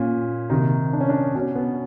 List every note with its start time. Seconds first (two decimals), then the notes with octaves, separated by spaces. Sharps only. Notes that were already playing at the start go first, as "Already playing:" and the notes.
Already playing: A#2 C#4
0.50 C3 D#3 D#4
0.93 D4
1.01 C#4
1.09 D4
1.35 B2 C#4
1.56 B3